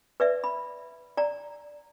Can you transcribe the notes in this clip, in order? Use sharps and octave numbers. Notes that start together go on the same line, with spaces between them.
B4 D5 E5
B5
D5 A#5